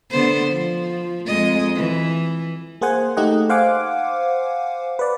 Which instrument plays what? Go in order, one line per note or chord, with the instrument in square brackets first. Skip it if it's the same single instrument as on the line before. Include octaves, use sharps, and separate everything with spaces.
[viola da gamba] D3 B3 C5
F3
F2 G#3 D#5
E3
[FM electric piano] A#3 G#4 C5 F#5 G#5
A3 D#4 G4 D#5 F#5
C5 F5 F#5 G#5 D6
B4 D5